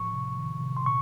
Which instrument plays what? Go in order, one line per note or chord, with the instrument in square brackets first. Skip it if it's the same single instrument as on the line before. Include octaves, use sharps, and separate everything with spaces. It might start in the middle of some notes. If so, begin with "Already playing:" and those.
Already playing: [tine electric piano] A2 F3 C#6
C3
D#3
C3
C6
A#2 C#6